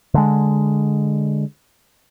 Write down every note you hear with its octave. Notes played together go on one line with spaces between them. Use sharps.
D3 G#3